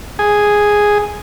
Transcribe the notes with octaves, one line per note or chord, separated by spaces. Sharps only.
G#4